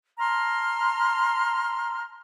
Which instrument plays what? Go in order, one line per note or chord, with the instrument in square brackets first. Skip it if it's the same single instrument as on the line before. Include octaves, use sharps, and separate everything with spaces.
[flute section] A5 A#5 C6 F6